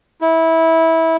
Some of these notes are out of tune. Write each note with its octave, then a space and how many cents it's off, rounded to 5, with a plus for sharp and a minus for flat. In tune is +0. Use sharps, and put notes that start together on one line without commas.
E4 -20